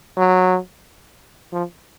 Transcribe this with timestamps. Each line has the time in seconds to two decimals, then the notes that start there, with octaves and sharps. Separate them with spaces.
0.17 F#3
1.53 F3